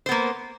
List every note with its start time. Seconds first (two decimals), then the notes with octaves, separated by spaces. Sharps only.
0.06 C5
0.09 B3
0.11 A#3